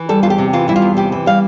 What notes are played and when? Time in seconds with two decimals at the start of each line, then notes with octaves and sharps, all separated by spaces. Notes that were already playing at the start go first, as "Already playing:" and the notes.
Already playing: E3
0.09 G3 A4
0.23 E2 F4
0.30 G4
0.38 C3
0.53 E3 F4
0.68 G3 E4
0.76 F4
0.82 E2
0.97 C3 G4
1.12 E3
1.26 G3 F5